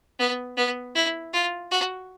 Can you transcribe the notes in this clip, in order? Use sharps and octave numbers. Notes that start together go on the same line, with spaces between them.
B3
B3
E4
F4
F#4